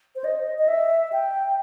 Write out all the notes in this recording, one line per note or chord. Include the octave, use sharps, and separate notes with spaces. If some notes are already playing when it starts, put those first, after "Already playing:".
C5
D#5
D#5
E5
G5